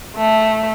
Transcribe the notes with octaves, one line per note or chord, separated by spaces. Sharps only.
A3